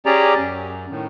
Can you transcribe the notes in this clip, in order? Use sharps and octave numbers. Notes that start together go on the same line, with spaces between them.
C#4 G4 G#4 D5 A#5
F#2
A2 D#3